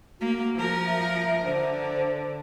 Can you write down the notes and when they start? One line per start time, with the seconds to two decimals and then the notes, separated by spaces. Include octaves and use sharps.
0.21 A#3 F#4
0.56 F3 A#4
0.87 E5
1.45 D3 C5